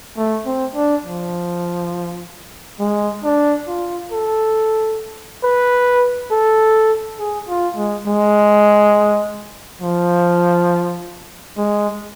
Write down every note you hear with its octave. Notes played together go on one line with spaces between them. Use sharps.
A3
C4
D4
F3
G#3
D4
F4
A4
B4
A4
G#4
F4
G#3
G#3
F3
G#3